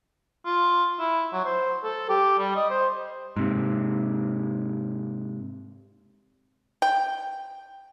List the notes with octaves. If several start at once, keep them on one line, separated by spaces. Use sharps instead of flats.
F4
E4
F#3
C5
A4
G4
G3
D#5
C5
G#2 C3
G5